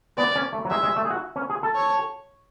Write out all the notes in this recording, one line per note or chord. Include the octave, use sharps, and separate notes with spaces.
B3 D5
C#4
A3
F#3
G#3 E5
G#3
A3
G#4
F#4
C#4
G#4
A4
C#5